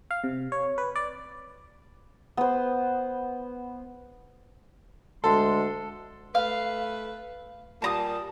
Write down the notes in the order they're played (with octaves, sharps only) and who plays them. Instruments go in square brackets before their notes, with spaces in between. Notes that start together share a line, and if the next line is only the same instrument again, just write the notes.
[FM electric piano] F5
C3
C#5
B4
D5
[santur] B3 C5
[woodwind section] D2 G#3 C6 [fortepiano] A4
[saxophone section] A3 B4 [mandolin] F5
[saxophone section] A#2 G3 A#3 [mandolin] A5 A#5 D#6